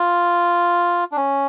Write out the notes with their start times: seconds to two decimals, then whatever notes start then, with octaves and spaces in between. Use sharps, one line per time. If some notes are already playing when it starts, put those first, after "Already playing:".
Already playing: F4
1.12 D4
1.17 C#4